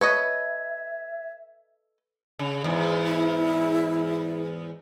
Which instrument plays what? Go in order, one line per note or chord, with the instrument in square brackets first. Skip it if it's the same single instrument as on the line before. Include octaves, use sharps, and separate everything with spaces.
[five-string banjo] A4 C#5 D#5 [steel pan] B4 [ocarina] E5 [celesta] G#6
[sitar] C#3
E2 G#2
[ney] E4